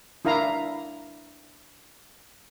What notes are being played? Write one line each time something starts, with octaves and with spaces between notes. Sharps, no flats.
D4 E4 A#4 F5 A#5